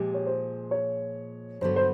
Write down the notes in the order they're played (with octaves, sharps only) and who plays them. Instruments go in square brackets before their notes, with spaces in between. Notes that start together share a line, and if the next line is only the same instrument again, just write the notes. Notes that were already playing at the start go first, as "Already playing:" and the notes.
Already playing: [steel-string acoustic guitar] A#2 F3 G#3 [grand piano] G4
[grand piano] C#5
C5
C#5
[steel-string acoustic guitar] G2 D3 F#3 B3 [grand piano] C5
[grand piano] C5